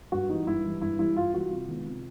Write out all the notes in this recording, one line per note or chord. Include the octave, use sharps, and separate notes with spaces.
G2 F#4
E3 G3 D#4
G2 E4
E3 G3
G2 E4
E3 G3 E4
G2 F4
E3 G3 F#4
C3 F4
D#3 G#3 B3
C3